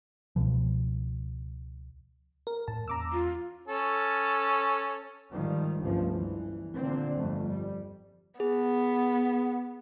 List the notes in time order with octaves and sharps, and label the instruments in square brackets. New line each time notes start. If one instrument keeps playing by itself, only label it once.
[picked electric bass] C#2 B2 F3
[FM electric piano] A#4
[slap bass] A2 [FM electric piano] A5
[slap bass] E2 A#3 C#4 [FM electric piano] A#5 D6 E6
[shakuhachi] F4
[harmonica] C#4 A4
[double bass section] G#2 D#3 F3 G3
G1 C#2 G2 F3 A3
G1 E3
A#2 D3 C4
G1 F2 A3
G3
[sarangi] B3 [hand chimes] G#4